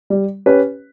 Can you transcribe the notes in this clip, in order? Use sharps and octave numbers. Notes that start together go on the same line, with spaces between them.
G3
C#4 G4 B4